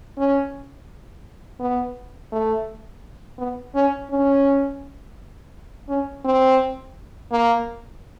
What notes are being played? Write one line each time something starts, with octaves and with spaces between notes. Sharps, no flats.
C#4
B3
A3
B3
C#4
C#4
C#4
C4
A#3